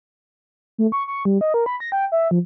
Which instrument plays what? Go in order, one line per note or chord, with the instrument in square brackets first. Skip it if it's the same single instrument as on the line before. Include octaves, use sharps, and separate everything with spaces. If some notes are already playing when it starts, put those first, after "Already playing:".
[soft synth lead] A3
C#6
C#6
G3
D#5
A#4
B5
A#6
G5
E5
F3